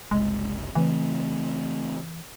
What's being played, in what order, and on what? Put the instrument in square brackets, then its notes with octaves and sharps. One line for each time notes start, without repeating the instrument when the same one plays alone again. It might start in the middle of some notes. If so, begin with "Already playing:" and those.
[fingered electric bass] F#1 C2 [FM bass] G#3
[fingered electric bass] C#3 A3 C4 [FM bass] E3